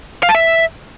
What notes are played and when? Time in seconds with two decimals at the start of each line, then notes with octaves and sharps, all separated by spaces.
0.23 F5
0.29 A5
0.35 E5